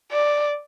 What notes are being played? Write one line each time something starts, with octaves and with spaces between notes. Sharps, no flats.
D5